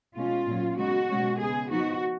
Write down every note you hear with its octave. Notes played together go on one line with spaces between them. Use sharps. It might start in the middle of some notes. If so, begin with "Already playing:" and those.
B2 G#3 C#4 F4
A#2 F#3 C#4
C#3 G#3 B3 D#4 F#4
B2 G#3 C#4
C#3 G#3 B3 G#4
F3 B3 D#4 F#4